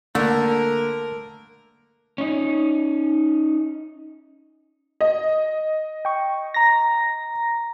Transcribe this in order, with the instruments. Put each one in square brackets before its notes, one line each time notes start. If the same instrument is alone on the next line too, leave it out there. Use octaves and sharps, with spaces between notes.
[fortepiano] D3 [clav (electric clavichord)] A3 [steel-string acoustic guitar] A#3 [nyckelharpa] A#4
[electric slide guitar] C#4 D#4
[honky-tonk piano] D#5
[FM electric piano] G5 C#6
A#5 A#6